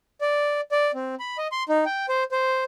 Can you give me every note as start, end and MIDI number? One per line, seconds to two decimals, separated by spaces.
0.21 0.61 74
0.72 0.91 74
0.94 1.15 60
1.20 1.37 83
1.38 1.47 75
1.52 1.63 84
1.69 1.85 63
1.86 2.06 79
2.09 2.24 72
2.32 2.64 72